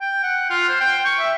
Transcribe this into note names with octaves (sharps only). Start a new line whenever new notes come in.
G5
F#5
F4
C5
G5
C#6
E5